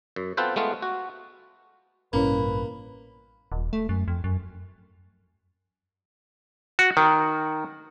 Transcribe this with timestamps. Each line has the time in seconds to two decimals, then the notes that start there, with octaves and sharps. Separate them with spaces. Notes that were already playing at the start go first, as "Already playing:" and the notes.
0.16 F#2
0.37 B3 C4 F4 A4 B4 C5
0.56 G#3 A3 B3 F4
0.82 F#4
2.13 A1 G2 B2 A#3 C#4 E4 B4 C#5
3.52 D#1
3.73 A3
3.89 F#2
4.08 F2
4.24 F#2
6.79 F#4
6.97 D#3